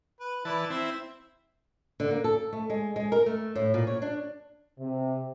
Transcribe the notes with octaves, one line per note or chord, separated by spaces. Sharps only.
B4
E3 E4 B4 D5 A5
C4 E4 E5
D3
A#3
A4
A3
G#3
G#3
A#4
A3
A2
A#2
C#5
D4
C3